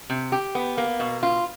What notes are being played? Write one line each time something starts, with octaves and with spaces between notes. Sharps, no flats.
C3
G4
B3
A#3
B2
F4